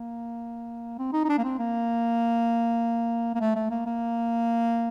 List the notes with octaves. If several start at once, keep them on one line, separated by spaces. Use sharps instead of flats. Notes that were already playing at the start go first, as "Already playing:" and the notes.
Already playing: A#3
C4
D#4
D#4
D4
A#3
C4
A#3
A#3
A3
A3
A#3
A#3